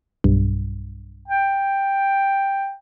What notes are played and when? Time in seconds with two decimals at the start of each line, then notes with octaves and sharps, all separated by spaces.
0.24 B1 G2
1.28 G5